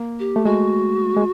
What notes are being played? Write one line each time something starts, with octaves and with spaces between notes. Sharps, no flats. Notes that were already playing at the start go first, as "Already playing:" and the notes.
Already playing: A#3
G4
A3
G#3 F#4
G#3